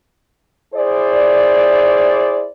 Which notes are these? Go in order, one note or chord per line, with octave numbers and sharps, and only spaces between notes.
E4 G#4 C5 D5